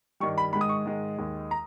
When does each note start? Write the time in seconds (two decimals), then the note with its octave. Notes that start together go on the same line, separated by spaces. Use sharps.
0.20 G2 D#3 G3 C#6
0.38 B5
0.53 G#2 D#3 G#3 B5
0.61 D#6
0.69 C#6
0.86 G#2 D#3 G#3
1.18 D#2 D#3 G#3
1.51 A#5